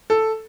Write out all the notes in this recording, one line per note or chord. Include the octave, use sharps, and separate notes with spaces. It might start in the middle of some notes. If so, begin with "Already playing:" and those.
A4